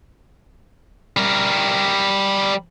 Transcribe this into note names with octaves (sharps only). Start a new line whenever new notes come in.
G3 A#4